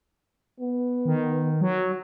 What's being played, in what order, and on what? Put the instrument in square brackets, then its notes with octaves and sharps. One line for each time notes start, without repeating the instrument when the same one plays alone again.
[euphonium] B3
[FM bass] D#3
F#3